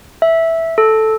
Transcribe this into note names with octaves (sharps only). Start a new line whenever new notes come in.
E5
A4